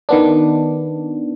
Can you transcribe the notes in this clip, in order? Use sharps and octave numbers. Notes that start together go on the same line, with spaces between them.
D#3 B3 D4